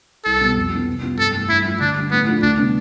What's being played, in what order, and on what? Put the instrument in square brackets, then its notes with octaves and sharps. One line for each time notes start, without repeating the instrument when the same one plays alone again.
[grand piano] C2 [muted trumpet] A4
[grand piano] B2 G3 C4
F2
E3 B3
C3
G3 B3 F4
[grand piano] G2 [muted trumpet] A4
[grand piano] E3 A3 E4
[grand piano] G2 [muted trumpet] E4
[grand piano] F3 A3
[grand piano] D3 [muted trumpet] D4
[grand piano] G3 D4
[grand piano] A2 [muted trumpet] B3
[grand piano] F3 A3 D4 F4
[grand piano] D2 [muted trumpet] D4
[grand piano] C3 G3 B3 D4